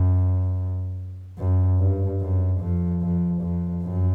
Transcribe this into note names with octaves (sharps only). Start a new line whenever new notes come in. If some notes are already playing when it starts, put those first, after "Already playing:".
Already playing: F#2
F#2
G2
F#2
F2
F2
F2
F#2